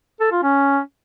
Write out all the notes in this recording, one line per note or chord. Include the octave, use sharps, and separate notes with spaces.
A4
F4
C#4